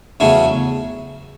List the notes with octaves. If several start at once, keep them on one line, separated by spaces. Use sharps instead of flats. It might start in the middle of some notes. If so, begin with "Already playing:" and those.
E2 C#3 F#3 A3 C#4